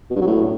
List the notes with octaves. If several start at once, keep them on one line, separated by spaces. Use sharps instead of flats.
B2
G2
F#3
A2